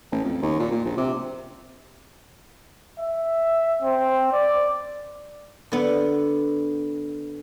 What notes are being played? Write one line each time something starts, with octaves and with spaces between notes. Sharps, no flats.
A1
F2
D#2
A#2
A#2
A#1
C3
E5
C4
D5
D3 B3